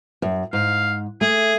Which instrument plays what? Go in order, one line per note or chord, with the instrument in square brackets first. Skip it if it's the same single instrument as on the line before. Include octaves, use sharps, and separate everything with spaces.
[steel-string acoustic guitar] F#2
[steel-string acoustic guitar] G#2 [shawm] F5
[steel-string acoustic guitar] A3 [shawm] G#4